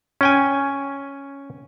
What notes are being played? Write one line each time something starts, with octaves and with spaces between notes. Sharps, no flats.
C#4 G5 G#5